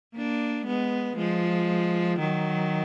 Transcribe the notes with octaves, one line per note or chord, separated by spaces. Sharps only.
A#3 D4
G#3 B3
F3 G#3
D#3 F#3